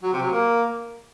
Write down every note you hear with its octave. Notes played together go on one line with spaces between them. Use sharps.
F#3
C3
F#3
A#3